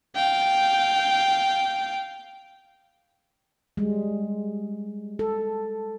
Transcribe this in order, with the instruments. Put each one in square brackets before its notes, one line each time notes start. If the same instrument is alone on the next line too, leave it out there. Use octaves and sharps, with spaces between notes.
[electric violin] F5 G5
[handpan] G3 G#3
A4